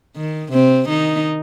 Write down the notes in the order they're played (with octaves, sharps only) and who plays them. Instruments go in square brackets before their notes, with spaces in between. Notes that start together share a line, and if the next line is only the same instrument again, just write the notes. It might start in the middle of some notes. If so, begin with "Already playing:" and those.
[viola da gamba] D#3
C3 C4
D#3 D#4